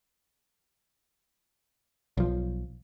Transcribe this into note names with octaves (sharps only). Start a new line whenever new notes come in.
B1 F3